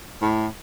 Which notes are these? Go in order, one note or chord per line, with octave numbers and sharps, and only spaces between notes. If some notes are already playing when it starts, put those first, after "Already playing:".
A2